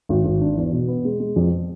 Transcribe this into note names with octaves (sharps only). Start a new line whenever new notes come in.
G#1
G#1
D4
E2
B2
B3
G#3
G#3
F2